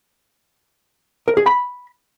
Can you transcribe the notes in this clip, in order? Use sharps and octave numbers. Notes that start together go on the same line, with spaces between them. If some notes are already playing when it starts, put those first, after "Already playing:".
A#4
G#4
B5